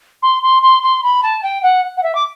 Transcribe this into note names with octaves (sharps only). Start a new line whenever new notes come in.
C6
C6
C6
C6
B5
A5
G5
F#5
F#5
E5
D6